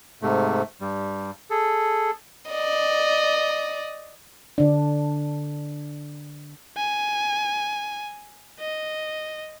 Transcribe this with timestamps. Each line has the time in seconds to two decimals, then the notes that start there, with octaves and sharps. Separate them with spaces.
0.22 G#2 C3 A3
0.81 G2 G3
1.50 G#4 A4
2.50 D5 D#5
4.58 D3 D4
6.77 G#5
8.60 D#5